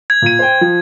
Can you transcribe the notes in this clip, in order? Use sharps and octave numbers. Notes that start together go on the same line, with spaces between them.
G#6
A#2 D#7
C5 G5
F3